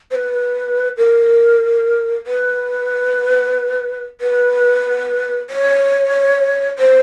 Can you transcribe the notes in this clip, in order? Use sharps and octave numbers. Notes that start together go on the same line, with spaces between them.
C5
B4
A#4
B4
B4
C#5
C5